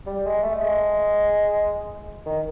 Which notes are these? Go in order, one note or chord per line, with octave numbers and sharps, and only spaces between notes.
G3
G#3
A3
G#3
D#3